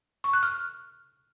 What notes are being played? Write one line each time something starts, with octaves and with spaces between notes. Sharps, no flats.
C#6
F#6
F6